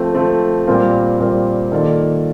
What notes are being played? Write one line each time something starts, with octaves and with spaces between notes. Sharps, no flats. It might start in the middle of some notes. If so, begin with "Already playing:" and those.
Already playing: F3 A3 C4
F3 A3 C4
A#2 G3 C4 F4 A#4
A#2 G3 C4 F4 A#4
D#3 A#3 F4 A4 D5